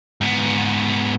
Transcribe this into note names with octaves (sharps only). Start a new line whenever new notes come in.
G#2 B3